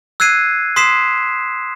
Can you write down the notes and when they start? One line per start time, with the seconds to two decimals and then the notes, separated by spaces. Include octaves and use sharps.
0.20 E6 F#6 G#6 C7 D#7
0.76 C6 D#6 B6 C7 E7